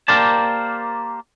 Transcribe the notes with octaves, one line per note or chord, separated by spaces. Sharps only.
A#3 G4 A#4 C5 D5 A5